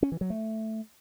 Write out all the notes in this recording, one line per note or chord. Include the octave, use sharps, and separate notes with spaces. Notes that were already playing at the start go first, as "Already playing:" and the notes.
C#4
E3
F#3
A3